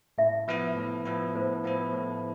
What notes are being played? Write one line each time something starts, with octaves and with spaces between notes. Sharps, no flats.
A2 E5
F3 B3 E4
A2
F3 B3 E4
A2 C5
F3 B3 E4
A2